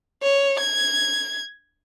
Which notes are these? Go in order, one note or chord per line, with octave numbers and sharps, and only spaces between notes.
C#5
G#6